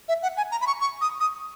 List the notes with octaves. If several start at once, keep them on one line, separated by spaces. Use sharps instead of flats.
E5
F#5
G#5
A#5
B5
C#6
C#6
D#6
D#6